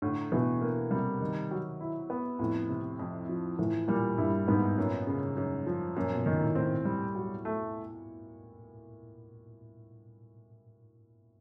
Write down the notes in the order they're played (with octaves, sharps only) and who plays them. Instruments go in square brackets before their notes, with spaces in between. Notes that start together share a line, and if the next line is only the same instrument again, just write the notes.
[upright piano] A2 [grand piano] D3
[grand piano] B2 [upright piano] E3
[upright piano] A#3
[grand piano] C3 [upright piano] G3
[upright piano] D#3
F#3
E4
B3
[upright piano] F2 [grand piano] A2
[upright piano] C3
F2
F3
[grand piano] A2 [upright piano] E3
[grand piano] A#2 [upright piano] G3
[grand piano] G2 [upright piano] E4
[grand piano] G#2 [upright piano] B3
[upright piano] F#2 [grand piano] A#2
[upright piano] C#3
F#2
F3
[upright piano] F#2 [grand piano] A#2
[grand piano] B2
[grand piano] A#2 [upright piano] D#3
[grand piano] A2
[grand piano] A2 [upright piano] C4
[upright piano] G3
F#3
A3